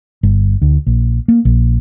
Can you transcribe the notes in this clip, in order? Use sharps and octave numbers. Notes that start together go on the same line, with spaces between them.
G1
D2
A#1
A#3
A#1